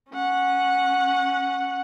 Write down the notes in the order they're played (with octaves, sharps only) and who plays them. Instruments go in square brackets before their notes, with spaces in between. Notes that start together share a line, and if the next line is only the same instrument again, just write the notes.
[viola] C#4 F#5